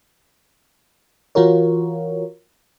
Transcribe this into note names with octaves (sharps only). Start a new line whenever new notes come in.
E3 F4 F#4 A#4 C#5